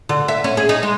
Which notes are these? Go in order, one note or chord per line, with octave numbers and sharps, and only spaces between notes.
D3
E5
C#4
G#4
D#4
G#3